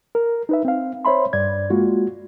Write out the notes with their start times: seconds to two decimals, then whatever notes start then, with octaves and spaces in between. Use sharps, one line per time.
0.15 A#4
0.49 D#4 B4 E5
0.65 C4 F5
1.05 C5 C#5 E5 B5 C6
1.33 G2 D5 G#6
1.70 G#3 A#3 F4 F#4